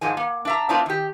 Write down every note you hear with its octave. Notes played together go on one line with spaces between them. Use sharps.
G#2 F3 G#3 G#5
A#3
D4 E5 A#5
B3 C4 D4 E4 F4
D#3 G4